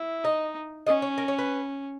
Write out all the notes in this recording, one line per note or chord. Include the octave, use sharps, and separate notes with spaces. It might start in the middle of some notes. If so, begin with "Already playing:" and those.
Already playing: E4
D#4 D#5
C#4 D#5
C#5
A#4
C#5
B4